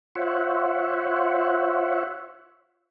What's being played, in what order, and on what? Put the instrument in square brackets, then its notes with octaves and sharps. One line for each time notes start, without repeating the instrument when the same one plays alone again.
[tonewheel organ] F4 C5 C#5 E5 F#5